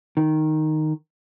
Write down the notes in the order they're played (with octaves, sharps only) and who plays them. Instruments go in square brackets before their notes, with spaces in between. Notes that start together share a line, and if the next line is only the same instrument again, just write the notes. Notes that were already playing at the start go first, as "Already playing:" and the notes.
[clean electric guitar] D#3